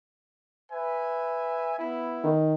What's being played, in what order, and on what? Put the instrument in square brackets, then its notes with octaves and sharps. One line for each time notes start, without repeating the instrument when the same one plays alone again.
[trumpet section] B4 E5 G#5
B3 E4
[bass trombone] D#3